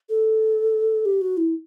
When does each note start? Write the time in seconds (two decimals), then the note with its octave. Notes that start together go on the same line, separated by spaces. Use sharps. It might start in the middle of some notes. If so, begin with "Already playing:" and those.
0.09 A4
1.05 G4
1.21 F#4
1.37 E4